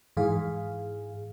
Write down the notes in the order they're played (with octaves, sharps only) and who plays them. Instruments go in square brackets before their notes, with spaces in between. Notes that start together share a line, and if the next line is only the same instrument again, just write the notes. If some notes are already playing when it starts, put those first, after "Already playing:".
[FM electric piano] G#2 E3 G#4 F5